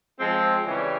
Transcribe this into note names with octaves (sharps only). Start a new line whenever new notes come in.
F3 G#3 C4
C#3 E3 G3